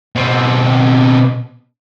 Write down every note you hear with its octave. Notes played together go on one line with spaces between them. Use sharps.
B2 C4